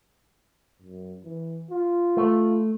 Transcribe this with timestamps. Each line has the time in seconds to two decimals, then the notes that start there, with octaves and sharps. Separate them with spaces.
0.82 F#2
1.24 E3
1.71 F4
2.17 A3